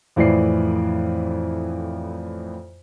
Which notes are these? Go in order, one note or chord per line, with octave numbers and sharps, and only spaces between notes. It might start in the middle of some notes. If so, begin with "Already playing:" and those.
F2 A2 E3 C5 D5 C7